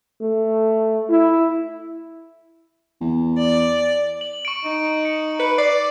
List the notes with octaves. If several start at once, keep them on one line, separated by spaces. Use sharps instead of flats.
A3
E4
E2
D5
F#7
C#6 C#7 D7
D#4
C#7
B4 C#7
D5 C7